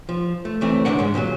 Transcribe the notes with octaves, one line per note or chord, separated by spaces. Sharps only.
F3
A3
C#2 E3 A3 C4
D2 G#2 C#3 D4 A#4 F#5
G#2 G#3
D#2 A#2 D3 F#3